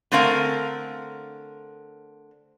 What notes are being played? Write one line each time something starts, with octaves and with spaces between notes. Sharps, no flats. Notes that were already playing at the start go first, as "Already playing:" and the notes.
D3 A3 C4 A#4 F5 G#5